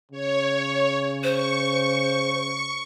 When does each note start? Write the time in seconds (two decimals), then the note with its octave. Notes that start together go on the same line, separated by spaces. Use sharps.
0.11 C#3 C#5
1.24 C5 C#6